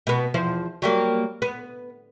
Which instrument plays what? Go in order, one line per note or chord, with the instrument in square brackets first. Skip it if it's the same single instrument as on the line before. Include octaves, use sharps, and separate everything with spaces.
[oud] B2 B3
E2 F3 C5
F#3 G3 A#3
B3